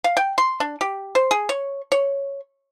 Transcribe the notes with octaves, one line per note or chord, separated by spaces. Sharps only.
F5
G5
C6
D4
G4
C5
G#4
C#5
C#5